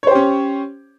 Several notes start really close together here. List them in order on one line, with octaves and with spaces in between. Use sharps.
C#5 C5 G4 C#4